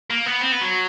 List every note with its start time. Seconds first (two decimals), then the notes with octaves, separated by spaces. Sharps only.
0.10 A#3
0.26 B3
0.41 C4
0.52 B3
0.61 F#3